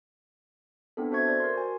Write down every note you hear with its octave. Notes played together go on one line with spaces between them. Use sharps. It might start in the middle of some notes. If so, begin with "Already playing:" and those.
B3 C4 D4 E4 A4
F#4 A4 C5 E5 C#6 G#6
C5 D5
A#4 C6
F#4 G#5